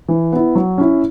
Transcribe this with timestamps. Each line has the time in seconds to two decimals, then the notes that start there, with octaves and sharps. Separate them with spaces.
0.08 E3
0.33 B3 E4
0.55 F#3
0.78 C#4 E4